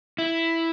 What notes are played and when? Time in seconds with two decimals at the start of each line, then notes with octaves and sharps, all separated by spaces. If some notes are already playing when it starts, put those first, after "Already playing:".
0.18 E4